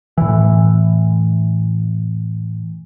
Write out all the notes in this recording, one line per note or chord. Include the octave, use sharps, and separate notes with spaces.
A2 E3